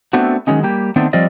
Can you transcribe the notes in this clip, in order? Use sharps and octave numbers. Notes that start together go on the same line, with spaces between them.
A3 B3 C4 D4 F#4
D#3 F#3 G#3 C#4 D#4
G3 A#3 G4
D#3 A3 B3 C4 D4 D#4
F3 G3 C4 F4 D5 D#5